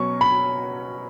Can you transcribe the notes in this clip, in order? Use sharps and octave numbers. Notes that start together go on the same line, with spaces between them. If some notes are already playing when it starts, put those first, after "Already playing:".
Already playing: B2 F#3 C#4 C#6
B5